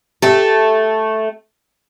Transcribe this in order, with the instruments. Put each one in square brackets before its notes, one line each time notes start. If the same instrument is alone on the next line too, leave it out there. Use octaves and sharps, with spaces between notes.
[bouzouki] A3 A4 [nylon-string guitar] G4 E5